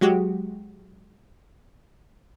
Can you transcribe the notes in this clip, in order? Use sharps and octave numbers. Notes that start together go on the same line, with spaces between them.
F#3 G#3 F#4 G4